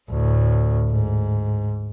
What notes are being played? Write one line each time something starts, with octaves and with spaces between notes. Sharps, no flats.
D2 A2
G#2